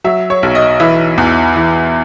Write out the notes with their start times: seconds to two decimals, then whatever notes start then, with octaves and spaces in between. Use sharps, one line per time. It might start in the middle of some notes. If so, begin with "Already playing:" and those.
0.04 F#3 E5
0.30 C#5
0.43 B1
0.55 D#5
0.80 E3 E5
1.18 E2
1.56 E3